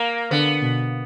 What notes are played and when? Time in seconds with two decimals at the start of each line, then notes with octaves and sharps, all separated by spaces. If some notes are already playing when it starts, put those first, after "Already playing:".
Already playing: A#3
0.31 D3 B3
0.62 B2